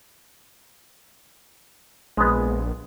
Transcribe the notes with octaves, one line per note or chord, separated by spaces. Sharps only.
A#1 G#3 B3